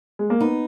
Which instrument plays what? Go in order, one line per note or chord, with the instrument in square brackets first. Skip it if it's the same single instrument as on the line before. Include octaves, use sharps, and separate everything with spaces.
[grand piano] G#3
A#3
[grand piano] B3 [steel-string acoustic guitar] D#4